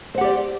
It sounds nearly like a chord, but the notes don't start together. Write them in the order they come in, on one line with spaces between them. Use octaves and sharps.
C5 F#5 G4 D5